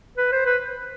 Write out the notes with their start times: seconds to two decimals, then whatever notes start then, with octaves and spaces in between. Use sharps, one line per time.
0.17 B4
0.32 C5
0.46 B4